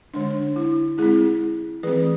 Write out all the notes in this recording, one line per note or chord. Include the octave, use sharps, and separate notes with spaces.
D3 G#3 D4
E4
G#3 C4 E4 G#4
E3 A3 C4 G#4 B4